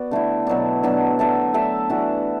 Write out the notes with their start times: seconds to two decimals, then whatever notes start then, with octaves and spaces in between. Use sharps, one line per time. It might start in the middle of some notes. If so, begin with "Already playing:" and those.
Already playing: B3 F#4 D5
0.11 D3 A3 E4
0.47 B2 F#3 D4
0.83 B2 F#3 D4
1.19 A3 D4 A4 E5
1.54 A3 D4 A4 E5
1.90 E3 D4 F#4